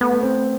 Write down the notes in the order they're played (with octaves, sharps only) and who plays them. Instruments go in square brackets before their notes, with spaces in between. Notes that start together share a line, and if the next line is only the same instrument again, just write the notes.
[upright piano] A3 [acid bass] B3
[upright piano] A3
C4